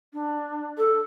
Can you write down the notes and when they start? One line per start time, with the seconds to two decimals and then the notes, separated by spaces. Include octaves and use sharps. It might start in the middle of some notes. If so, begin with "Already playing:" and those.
0.13 D4
0.78 A4